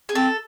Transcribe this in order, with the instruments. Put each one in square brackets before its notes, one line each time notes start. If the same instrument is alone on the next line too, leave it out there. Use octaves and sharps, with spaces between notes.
[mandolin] G#4
[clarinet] C4 [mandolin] A4